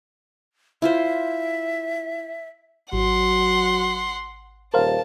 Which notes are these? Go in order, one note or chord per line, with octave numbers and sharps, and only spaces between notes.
E4 F4 C5 E5
G#1 F#3 F#5 C6
D#1 A#4 C5 F5 A5